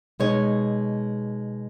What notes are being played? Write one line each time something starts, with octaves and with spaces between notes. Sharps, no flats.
B2 G#3 D#4 C#5